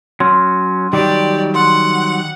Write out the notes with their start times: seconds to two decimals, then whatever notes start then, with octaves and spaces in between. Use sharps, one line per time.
0.20 F#3 C#4 C6
0.93 D#3 F#3 G3 G4 D5
1.55 F#5 C6